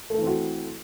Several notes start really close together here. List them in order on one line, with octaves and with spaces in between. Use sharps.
A3 A4 E3 C4 F#4